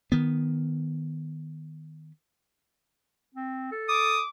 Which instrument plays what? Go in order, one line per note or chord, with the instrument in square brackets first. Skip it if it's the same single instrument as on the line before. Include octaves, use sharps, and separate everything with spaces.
[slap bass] D#3 B3
[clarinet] C4
A4
[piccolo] D6 [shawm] D#6